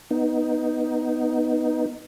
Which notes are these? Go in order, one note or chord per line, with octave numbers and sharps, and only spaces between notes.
B3 D#4